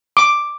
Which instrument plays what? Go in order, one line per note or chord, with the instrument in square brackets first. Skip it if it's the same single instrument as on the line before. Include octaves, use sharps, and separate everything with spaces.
[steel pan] D6